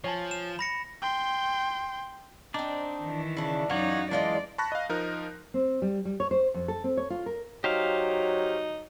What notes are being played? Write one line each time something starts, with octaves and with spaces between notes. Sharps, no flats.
F3 C#5 G#5 A5
E7
B5 A#6 C#7
G5 C6
C4 D4 D#4 D5
D#3 E3
C#3 D4 E4
F#2 E3 F#3 D#4 F4 F#4 C#5 D5
E3 G#3 D4 F4 D5 D#5
A5 B5 C#6 F#6 A#6
D#5 F5
F3 D#4 A#4
C4
G3
G3
C#5
C5
F2
A4
C4
C#5
F4
A#4
F#3 D#4 G4 C5 F5